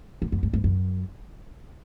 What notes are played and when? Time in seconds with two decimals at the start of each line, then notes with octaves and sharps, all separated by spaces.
0.22 F#2
0.32 F#2
0.43 G2
0.53 G2
0.64 F#2